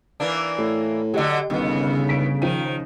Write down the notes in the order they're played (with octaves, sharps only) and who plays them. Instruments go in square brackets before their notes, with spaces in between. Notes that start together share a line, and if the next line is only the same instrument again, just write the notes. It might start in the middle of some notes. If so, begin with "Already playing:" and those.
[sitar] E3 A#3 D4
[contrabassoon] A2
[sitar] D3 F#3 [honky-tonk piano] G4 D#5
[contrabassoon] G1 [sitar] D#2 B3 [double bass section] C#3
[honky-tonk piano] B6 D7
[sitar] D#3 [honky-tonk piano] F3 D#7